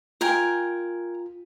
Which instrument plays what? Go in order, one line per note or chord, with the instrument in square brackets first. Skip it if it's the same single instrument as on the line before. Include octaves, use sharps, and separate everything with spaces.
[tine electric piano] F4 [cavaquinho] A#4 G5 G#5